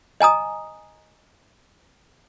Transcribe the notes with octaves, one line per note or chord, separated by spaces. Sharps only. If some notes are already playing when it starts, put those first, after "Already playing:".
D#5 G#5 A#5 D#6